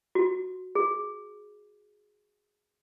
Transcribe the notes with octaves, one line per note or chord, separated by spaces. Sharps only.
F#4
G#4